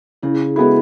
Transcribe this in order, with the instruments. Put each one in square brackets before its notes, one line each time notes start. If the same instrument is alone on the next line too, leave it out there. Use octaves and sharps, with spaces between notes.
[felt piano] C#3 [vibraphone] E4 G#4
[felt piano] G#3 B3 E4 [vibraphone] F#4 A4